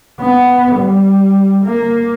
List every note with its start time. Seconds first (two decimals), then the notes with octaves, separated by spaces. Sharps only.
0.21 B3
0.77 G3
1.65 A#3